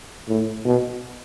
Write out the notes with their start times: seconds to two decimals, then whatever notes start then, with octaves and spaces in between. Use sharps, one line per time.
0.29 A2
0.65 B2